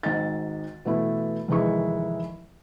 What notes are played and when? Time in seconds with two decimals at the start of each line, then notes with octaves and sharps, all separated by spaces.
0.03 G#1 G#2 D#5 A6
0.85 B2 E3 A3 E4
1.48 F1 D#2 E3 G#3 E4 C#6